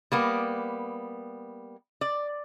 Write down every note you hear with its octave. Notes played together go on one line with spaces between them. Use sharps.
G3 A#3 B3
D5